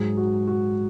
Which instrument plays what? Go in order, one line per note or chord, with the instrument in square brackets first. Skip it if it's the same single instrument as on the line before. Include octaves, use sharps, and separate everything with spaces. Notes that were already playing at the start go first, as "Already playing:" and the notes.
Already playing: [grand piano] G#2 F#3 G#4
F#4
F#4